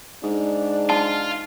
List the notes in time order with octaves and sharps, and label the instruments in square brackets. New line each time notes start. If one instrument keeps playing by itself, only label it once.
[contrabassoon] G#2 [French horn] D4
[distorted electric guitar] F4 [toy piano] A5